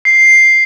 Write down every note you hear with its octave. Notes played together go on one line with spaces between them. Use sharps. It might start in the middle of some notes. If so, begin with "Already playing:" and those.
C7